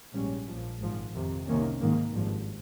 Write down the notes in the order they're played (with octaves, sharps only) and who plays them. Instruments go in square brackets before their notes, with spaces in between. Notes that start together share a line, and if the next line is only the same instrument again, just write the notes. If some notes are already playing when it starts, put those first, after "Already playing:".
[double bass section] A#1 G#2 G3 C#4
A#1 A#2 F3
G#1 G#2 F3
F2 C3 D#3
C2 C3 D#3 A#3 C#4
G#2 D#3 A#3
G#1 G2 F3